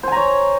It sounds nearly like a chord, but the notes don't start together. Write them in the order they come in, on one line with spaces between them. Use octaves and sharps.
C5 G#5 A#5 C#5